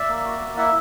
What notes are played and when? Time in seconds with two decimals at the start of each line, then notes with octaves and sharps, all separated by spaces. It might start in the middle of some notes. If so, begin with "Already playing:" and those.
Already playing: D5 E5
0.09 A#3
0.25 F#4
0.41 A#3
0.57 E4 E5 F#5